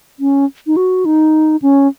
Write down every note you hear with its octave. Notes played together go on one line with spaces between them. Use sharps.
C#4
D#4
F#4
D#4
C#4